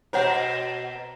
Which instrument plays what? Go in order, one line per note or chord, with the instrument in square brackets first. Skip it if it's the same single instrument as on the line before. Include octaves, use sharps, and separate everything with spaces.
[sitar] B2 C4 A#4 [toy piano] C5 C#5 F#5